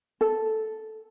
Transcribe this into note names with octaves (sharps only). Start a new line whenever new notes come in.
A4